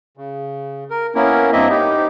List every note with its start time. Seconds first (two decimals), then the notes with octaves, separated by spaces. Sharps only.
0.17 C#3
0.90 A#4
1.15 A#3 B3 C#4 E4 A#4
1.52 G2 A#3 C4 E4 D#5 E5
1.70 D#4 G4